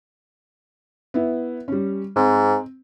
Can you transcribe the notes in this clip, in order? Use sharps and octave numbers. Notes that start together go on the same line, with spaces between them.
B3 E4
G3 C#4
G#2 C4